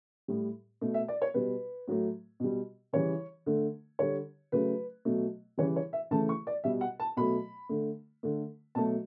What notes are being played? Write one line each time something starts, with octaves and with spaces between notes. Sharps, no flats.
A2 G3
B2 A3
E5
D5
C#5
B2 G3 B4
A2 F#3 A3
B2 G3
C#3 E3 G3 C#5
D3 A3
D3 G3 C#5
C#3 F#3 A3 B4
B2 F#3 A3
C#3 E3 G3 C#5
C#5
E5
C#3 E3 A3 A5
C#6
D5
B2 G3 E5
F#5
A5
B2 F#3 A3 B5
D3 A3
D3 A3
B2 F#3 A3 A5